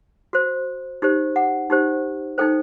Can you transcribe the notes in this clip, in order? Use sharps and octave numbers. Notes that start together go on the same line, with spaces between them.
F#4 C5
D#4 G4 C5
F#5
D#4 G4 C5
D#4 A4 C5 G5